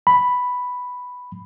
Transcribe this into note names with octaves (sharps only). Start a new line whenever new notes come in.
B5